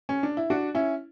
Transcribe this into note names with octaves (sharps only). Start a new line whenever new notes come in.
C#4
D4
E4
D4 F#4
C#4 E4